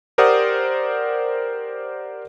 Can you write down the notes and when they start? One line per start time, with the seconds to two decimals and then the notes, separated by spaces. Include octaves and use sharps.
0.18 G4 A#4 C5 D5 F#5 D#6